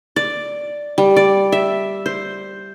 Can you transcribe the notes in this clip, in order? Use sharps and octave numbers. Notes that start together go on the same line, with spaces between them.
D5
G3
D5
E5
C5